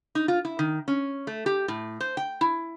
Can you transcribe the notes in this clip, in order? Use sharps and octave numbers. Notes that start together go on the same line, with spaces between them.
D#4
F4
E4
D#3
C#4
A3
G4
A2
C5
G5
E4